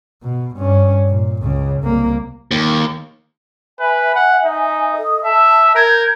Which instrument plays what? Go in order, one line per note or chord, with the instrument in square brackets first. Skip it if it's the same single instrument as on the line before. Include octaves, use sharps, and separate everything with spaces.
[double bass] B2
G2 C#4
A#2
C#2 C#3
C2 A#3
[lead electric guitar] D#2
[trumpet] B4 [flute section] E5 G#5
[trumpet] F#5
D#4
[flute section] A4 D#5 D#6
[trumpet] E5 [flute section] A5
[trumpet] A#4 [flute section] G6 G#6